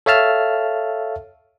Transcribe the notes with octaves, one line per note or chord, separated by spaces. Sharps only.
A4 C#5 E5 F5 A5 F6